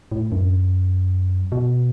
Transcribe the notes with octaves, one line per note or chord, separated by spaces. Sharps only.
A2
F#2
B2